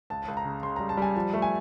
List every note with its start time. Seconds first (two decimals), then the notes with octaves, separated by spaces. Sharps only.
0.10 C#2 A5
0.28 C#2
0.37 A#5
0.45 C#3
0.63 C#3 C6
0.76 G3 A#5
0.89 A5
0.97 G3 G#5
1.16 F3 A5
1.34 A3
1.42 G#5